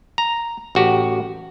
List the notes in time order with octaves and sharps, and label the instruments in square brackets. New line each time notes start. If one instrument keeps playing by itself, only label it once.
[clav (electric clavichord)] A#5
A1 F#4 G4